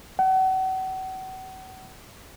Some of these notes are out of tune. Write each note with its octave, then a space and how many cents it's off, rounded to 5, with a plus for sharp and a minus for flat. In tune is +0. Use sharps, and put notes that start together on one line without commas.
F#5 +35